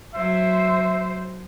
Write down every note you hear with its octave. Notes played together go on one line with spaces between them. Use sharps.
F#3 C5 E5